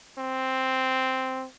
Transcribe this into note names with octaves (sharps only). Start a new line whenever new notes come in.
C4